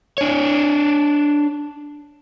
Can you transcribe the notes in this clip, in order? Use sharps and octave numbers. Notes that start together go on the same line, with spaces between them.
D4 C#5